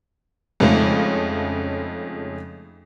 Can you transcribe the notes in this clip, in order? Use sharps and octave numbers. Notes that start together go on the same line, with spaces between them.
F2 C#3 F3 G#3 A3 D#4